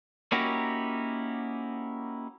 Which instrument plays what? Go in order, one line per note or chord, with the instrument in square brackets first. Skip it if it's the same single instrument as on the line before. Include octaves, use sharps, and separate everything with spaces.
[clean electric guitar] A#3 C#4 D#4 E4 F#4 G4